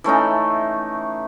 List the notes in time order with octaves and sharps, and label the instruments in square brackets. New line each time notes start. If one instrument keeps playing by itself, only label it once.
[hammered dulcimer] E3 A3 C#4 D#4